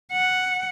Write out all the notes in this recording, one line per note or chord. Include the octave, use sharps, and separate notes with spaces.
F#5